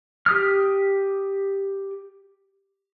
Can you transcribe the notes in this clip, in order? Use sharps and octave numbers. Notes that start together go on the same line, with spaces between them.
G4 D#6 F6